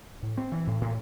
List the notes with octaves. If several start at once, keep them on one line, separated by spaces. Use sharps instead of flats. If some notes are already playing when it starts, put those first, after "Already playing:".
A2
C4
E3
A2
A2